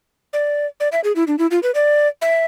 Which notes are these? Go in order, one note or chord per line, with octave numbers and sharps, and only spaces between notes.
D5
D5
E5
G#4
E4
D4
E4
F4
B4
D5
E5